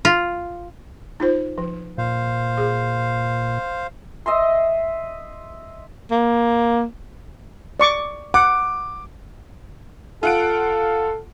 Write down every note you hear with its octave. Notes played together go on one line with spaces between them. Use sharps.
F4
D#4 F4 C5
F3
A#2 C5 F5
G#4
D#5 E5 C6
A#3
D5 C#6 D6
F#5 D6
F4 A4 F#5 D7